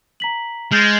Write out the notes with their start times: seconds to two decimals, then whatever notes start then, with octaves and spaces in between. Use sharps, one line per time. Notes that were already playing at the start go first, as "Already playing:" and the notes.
0.20 A#5 B6 F#7
0.72 G#3 F6 G6 A6